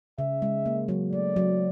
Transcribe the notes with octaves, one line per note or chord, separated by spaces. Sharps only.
C#3 E5
G#3
A#3
F#3
A3 D5
F#3